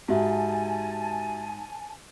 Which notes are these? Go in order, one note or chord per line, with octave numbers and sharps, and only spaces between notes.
G#2 F#4 G4 E5 G#5 A5